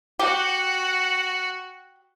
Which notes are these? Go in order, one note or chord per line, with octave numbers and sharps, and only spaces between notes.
F#4 G4 F#5